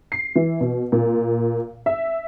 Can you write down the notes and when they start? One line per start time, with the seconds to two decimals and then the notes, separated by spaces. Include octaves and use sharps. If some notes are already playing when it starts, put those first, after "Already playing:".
0.12 C7
0.36 E3
0.61 B2
0.92 A#2
1.86 E5